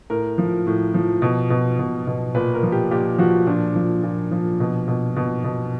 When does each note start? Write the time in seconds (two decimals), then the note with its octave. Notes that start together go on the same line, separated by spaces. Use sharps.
0.10 A2 A#4
0.38 F3
0.67 A2
0.94 F3
1.22 B2
1.50 B2
1.79 B2
2.07 B2
2.35 A#2 B4
2.54 A#4
2.63 F3
2.72 G4
2.91 A#2 G4
3.18 F3 F#4
3.47 A#2 D4
3.75 F3
4.03 A#2
4.31 F3
4.60 B2
4.88 B2
5.16 B2
5.44 B2